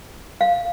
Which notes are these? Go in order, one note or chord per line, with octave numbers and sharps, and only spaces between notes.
F5